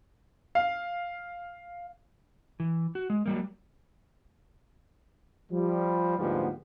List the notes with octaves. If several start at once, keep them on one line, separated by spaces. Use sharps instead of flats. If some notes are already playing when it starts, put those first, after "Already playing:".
F5
E3
F#4
G#3
F#3 G3 A#3
F3 G3
D2 G#2 F3 G3 A#3 B3